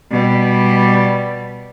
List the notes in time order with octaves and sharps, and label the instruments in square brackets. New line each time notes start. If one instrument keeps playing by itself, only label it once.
[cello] B2 G3